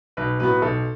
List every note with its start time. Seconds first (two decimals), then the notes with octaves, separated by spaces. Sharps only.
0.17 B1 B4
0.40 A2 F#3 B3 B4
0.62 B1 A4